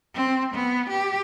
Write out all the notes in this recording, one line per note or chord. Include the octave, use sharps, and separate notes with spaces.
C4
B3
G4